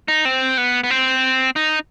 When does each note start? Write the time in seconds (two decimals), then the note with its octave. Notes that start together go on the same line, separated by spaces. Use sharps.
0.08 D#4
0.25 C4
0.57 B3
0.84 B3
0.90 C4
1.56 D#4